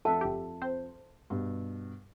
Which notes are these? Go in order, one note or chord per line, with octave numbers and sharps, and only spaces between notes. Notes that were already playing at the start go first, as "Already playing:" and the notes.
F2 F3 A4 E5 F#5 A5
G1 G4
C4 C5
G2 B2